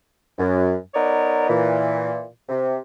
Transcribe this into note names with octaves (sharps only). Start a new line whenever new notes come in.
F#2
B3 D#4 A#4 C#5 D5
A#2 E3
C3